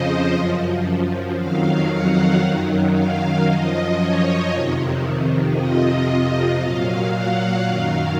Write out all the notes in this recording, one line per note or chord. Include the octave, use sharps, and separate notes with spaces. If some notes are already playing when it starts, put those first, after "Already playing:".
Already playing: F2 C#3 F3 C5 D#5
F#2 F3
F2 D#3 F#3 F5
F#5
F#2 D#3 F#3
F5
F#2 F3 D#5
C#5
F2 C3 D#3
F2 C3 F3 D#5
A#2 F#3 F5
F#5
F#2 D#3 F#3 F5